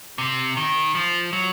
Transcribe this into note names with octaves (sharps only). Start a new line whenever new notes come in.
C3
D#3
F3
F#3